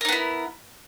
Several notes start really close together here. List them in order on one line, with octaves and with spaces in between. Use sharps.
A#4 D#4 B3 E4